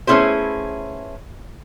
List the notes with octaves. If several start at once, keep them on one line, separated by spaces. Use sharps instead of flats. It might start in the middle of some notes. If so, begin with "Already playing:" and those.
A3 B3 C#4 E4 G#4 C5